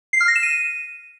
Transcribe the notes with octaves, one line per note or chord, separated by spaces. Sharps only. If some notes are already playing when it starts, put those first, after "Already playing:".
C7
F6
A#6
E7
D#7